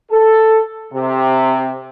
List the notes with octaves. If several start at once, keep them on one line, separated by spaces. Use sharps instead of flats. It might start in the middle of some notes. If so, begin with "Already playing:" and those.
A4
C3